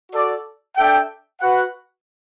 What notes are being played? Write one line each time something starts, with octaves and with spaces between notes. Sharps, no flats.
F#4 A4 D5
D4 A4 E5 G5
F#4 B4 F#5